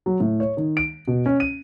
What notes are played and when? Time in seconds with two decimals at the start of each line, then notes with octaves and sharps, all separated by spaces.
0.06 F#3
0.20 A2
0.40 C#5
0.57 D#3
0.77 D7
1.07 B2
1.26 C#4
1.40 D#7